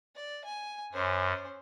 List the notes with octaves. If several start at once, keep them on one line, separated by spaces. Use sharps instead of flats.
D5
G#5
F#2 C#4 C5